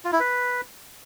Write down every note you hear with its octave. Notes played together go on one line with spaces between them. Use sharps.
F4
E4
B4